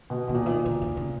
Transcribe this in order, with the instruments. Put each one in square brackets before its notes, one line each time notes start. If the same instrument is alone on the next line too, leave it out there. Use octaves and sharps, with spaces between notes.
[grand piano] B2
[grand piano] B2 [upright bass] D#3
[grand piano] A#2 [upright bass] D3
[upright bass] E3
D#3
D3
D3
C#3